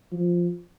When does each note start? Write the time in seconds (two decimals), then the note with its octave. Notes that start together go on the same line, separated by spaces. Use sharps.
0.12 F3